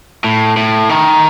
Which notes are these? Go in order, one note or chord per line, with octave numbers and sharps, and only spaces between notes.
A2
A2
D#3